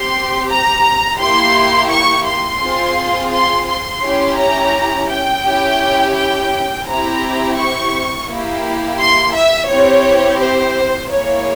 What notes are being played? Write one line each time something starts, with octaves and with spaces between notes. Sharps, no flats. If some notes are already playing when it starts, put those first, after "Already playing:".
Already playing: C4 G4 C6
A#5
A#3 E4 G4 C6
C#6
C6
C4 F4 G#4
C6
C6
C#4 E4 G4
A#5
G5
C#4 E4 G4
G5
C4 E4 G4 A#5
C#6
A#3 E4 G4
C6
E5
C4 E4 G4 C#5
C5
A#3 E4 G#4 C#5